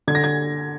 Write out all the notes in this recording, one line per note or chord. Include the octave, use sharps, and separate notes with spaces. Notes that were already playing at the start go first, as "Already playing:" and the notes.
D3 G#6
A#6
G#6